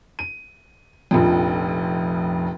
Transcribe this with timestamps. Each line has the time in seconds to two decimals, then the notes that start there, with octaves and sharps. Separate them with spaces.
0.19 D#7
1.11 F1 A#1 F2